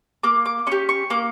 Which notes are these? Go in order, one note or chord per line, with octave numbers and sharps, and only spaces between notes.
A#3 D6
D6
C#4 G4 C#6
C#6
A#3 D6